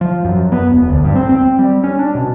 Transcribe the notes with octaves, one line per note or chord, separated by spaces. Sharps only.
F3
F#2
B3
E1
D2
G2
C4
C4
G3
C#4
D4
B2